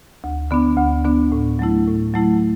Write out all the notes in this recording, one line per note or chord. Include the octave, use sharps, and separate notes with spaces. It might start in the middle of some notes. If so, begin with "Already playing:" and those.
D2
D3 B3 D4
D2
D3 B3 D4
A2
F#3 A3 E4
A2
F#3 A3 E4